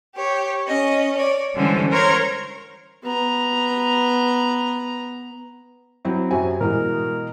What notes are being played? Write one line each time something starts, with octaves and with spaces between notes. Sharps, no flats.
G4 C#5
C#4 D#5
C#5 D5
D3 E3 G3 G#3 C#4 C5
A#4 C5 C#5 A#5 C6 G#6
B3 A#5
F#3 C4 E4
F#2 C3 F#3 G#5
B2 E3 G#3 A#4